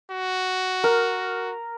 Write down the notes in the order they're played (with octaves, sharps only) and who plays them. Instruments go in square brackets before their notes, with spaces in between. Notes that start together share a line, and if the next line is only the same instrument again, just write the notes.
[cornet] F#4
[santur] A#4